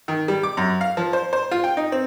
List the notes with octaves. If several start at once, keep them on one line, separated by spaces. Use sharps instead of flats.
D#3
G3
D6
F#2
F5
F3
C5
C5
F4
G5
D#4
C4